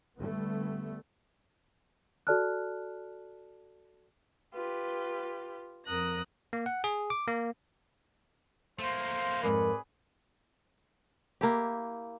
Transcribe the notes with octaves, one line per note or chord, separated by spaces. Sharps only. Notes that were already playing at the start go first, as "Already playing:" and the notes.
D3 G3 A3 B3
F#4 A4 D5 A5 F6 F#6
F4 G4 B4
F2 A#4 D#6 F#6 A#6
A#3
F#5
G#4
D6
A#3
A3 A#3 F4 C5
F2 G#2 G#4 A#4 B4 D5
A#3 E4 G4